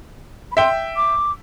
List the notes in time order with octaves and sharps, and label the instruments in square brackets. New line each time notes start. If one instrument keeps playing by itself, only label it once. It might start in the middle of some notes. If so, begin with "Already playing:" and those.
[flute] B5
[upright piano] E5 G5 [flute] C6
[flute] D6